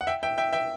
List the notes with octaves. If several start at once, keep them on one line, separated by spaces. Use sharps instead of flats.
F#5
E5 G5
E5 G5
E5 G5
E5 G5